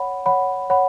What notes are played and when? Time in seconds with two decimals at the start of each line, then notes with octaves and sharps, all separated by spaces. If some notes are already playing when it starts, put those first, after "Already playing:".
Already playing: C#5 F#5 B5
0.26 C#5 F#5 B5
0.70 C#5 F#5 B5